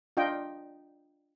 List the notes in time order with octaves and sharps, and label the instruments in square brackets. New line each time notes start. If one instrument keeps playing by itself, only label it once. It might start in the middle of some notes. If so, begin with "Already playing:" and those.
[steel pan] D4 F4 D#5 G5